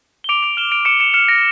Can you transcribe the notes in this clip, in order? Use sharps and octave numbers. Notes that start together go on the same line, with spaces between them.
G7
D6 D7 F7
D7 F7
F6 E7 G7
D7 F7
D6 C#7 E7
C#7 E7
F6 C#7 E7
A#6 D7